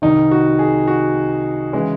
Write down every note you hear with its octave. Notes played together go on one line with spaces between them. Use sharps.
C2 C3 D#3 D#4
F#4
G#4
F#4
C#3 E3 G#3